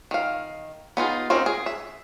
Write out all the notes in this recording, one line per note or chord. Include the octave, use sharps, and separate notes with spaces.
D#3 F5
B3 D#4 F4 G#4
C4 C#4 D#4 A#4
G#4
E5